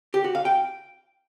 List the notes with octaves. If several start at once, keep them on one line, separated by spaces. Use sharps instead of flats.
G4
F#4
F5
G5